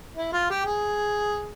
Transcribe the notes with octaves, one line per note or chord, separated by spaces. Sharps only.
E4
F4
G4
G#4